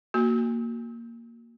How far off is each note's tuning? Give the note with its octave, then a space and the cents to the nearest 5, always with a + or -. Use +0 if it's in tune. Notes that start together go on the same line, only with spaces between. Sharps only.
A#3 -5 F#4 +0